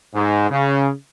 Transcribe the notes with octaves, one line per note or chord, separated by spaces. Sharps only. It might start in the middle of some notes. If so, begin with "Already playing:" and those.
G#2
C#3